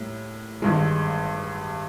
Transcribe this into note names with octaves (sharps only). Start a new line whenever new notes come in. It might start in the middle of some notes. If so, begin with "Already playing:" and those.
Already playing: A2 G3 A#3
G#1 G2 E3 G#3